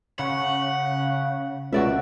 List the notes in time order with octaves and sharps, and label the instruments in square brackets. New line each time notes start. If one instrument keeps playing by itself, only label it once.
[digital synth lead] C#3 [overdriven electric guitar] F#5
[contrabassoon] C#2 [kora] F#4 D5 E5